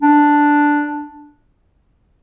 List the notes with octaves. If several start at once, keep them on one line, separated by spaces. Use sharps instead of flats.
D4